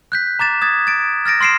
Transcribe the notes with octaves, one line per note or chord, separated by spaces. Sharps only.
F#6 G6 B6
A#5 D6 A6 E7
D#6 G#6 A6
A6 D7
F6 A6 A#6 D7
C6 F6 C7 D7 E7